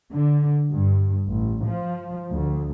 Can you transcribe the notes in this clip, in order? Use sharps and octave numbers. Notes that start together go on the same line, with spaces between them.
D3
G2
A1
F3
D2